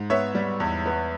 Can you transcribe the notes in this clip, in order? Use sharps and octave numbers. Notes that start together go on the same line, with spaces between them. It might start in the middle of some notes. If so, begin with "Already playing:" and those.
Already playing: G#2
B3 C#5 E5
G3
E2
B3